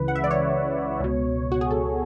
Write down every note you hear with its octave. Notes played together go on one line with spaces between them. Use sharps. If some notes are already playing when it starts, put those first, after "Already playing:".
Already playing: C#2 C#3 E3 B4
F#5
E5
D5
C#5
C#2 B2
F#4
G#4
A4